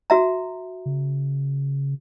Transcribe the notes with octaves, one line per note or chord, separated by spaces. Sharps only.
F#4 E5 A#5
C#3